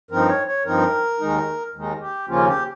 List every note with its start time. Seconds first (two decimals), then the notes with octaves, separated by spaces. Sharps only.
0.11 G2 F3 C4 D#4 A#4
0.29 C#5
0.47 C#5
0.65 G2 F3 C4 D#4 A#4
1.20 D#2 D#3 G#3 D#4
1.75 D#2 D#3 G#3 D#4
2.01 G4
2.29 D#2 C#3 F3 A#3 C#4 F4
2.47 G4